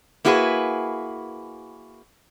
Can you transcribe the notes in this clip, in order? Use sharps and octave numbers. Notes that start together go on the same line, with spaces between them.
A#3 E4 F#4 G#4 A4 B4